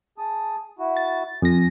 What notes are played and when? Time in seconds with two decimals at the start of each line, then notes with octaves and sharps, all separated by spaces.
0.18 G#4 A5 D#6
0.79 E4 F#4
0.97 A6
1.42 F2 G#5 A#6